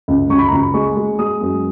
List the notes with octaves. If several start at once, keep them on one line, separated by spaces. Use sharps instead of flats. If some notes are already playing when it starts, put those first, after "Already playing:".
C#2
C#2 C#6
B5
A#5
C#2 B5
G#3 C#6
G#3
G#3 D#6
F#2